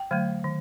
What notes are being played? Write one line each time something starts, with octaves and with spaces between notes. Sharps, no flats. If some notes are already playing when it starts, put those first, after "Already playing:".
Already playing: G5
D3 F#3 A3
D#3